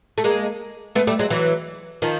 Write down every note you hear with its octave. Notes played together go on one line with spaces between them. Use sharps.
A3
G#3 A#3
A3 B3
G3 A3
F#3 G#3
E3 F#3
D#3 F3